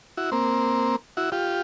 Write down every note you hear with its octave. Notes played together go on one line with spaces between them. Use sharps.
E4 F#4
A#3 C4
E4 F#4
F4 G4